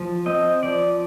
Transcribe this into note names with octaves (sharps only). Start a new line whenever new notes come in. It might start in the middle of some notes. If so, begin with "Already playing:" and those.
Already playing: F3
C4 D#5
F3 D5